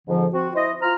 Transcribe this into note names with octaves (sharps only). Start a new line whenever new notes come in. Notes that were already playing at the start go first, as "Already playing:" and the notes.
F2 G#2 D3 F3
C4 F#4
E4 C5 D#5
F4 C5 A#5 F6